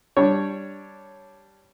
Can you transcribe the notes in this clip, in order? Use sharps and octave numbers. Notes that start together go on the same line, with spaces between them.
G3 D4 C#5